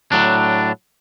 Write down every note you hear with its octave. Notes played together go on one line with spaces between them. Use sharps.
A2 F#3 D4